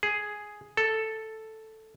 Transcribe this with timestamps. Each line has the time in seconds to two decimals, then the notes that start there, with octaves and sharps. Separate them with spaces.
0.03 G#4
0.77 A4